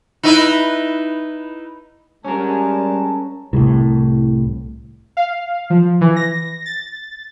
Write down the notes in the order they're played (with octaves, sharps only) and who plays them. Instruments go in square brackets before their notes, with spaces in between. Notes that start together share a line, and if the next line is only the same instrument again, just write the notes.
[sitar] D#4 E4 B4
[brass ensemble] G3 G#3 A5 [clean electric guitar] C#4 A#4
[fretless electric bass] C2 A2
[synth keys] F5
F3
E3
A#6
A6